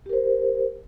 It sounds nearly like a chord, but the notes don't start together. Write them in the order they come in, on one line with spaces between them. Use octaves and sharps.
G4 A#4 C5